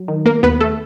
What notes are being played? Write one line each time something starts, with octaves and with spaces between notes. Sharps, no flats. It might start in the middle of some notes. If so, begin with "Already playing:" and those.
Already playing: F#3
D#3
A#3 A#4
D#2 B3 B4
A3 A4